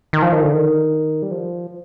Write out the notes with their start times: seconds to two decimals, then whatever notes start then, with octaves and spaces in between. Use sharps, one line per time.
0.13 D#3
0.22 F3
0.32 D#3
0.42 D3
0.53 D#3
1.22 G3
1.31 F3